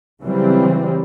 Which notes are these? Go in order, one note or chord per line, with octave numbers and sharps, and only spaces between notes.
C#3 E3 F#3 G3 C4